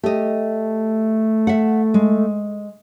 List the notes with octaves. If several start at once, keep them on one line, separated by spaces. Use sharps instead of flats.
A3 G4 D#5
E5 F#5
G#3